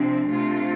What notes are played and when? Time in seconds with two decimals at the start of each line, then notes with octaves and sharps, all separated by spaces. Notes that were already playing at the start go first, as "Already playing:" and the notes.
Already playing: C3 F3 C4 D4
0.30 C3 A3 F4